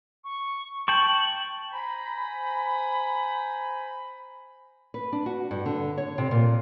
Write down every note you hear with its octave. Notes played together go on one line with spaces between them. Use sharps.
C#6
G5 A5 C#6 F#7
C5 G#5 A#5 B5
B4
D4
F#4
G2
D3
C#5
C3
A#2